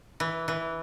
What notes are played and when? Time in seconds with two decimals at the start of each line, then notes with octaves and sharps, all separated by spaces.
0.20 E3
0.48 E3